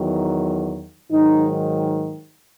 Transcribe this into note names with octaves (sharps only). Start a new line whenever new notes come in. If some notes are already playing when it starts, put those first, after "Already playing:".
Already playing: E2 D#3 F#3
G#2 D#3 F#3 D#4